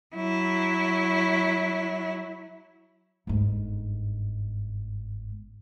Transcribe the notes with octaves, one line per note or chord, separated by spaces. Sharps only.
F#3 E4
G1 G#2